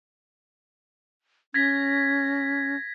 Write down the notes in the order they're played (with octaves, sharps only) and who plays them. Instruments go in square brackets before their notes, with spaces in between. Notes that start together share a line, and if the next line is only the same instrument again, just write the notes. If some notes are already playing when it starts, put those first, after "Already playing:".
[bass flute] C#4 [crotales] G#6 A#6 B6